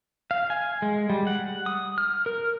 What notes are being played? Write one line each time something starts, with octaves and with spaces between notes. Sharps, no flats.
F5
G#5
G#3
G3
F#5
D#6
F6
A#4